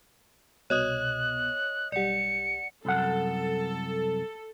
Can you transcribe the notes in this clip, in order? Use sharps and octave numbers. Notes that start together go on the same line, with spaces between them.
C2 B2 C#5 D#5 D#6 F#6
B1 G3 D5 F#5 C#7
C2 F#2 A4 F#5